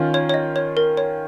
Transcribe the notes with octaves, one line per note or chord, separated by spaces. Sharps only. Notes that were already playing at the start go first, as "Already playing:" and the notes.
Already playing: D#3 C#4 F4
C#5
C#5
D#5
C#5
A#4
C#5